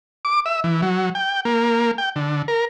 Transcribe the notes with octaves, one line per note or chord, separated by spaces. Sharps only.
D6
E5
E3
F#3
G5
A#3
G5
D3
A#4